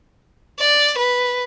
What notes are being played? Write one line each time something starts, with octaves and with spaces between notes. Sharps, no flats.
D5
B4